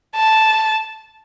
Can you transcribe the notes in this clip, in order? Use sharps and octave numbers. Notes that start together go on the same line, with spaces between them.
A5